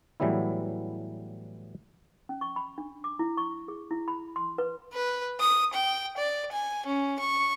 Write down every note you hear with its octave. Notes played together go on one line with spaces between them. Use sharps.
A2 E3 F#3 G3 B3 E4
C#4
C#6
B5
D4
D6
E4
C#6
G#4
E4
B5
C6
B4
B4
D#6
G5
D5
G#5
C#4
C#6